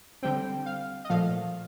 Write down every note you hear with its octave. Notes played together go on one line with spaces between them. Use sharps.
D3 G3 C4 G5
F5
D#5
A#2 F3 A3 F5